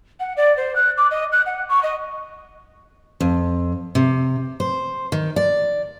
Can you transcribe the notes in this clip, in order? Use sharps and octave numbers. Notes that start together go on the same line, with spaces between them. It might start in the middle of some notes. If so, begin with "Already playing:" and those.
F#5
D5
C5
F#6
D6
D#5
F#6
F#5
C#6
D#5
F2
C3
C5
D#3
D5